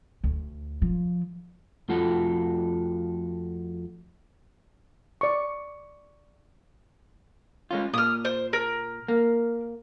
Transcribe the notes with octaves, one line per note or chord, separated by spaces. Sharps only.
D2
F3
F2 A3 F4 F#4 A4 F#5
D5 C#6
G#3 C#4 F4
A#2 D#6 F6
C5
A#4
A#3